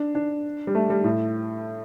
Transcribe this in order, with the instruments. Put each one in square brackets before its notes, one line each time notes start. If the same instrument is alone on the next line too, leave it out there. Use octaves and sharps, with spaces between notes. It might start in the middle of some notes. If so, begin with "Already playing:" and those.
Already playing: [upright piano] D4
D4
G3
A3
G3
A2